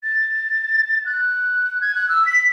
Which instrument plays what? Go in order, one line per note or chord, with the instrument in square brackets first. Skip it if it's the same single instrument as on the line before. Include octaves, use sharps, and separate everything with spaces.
[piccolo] A6
F#6
G#6
F#6
E6
B6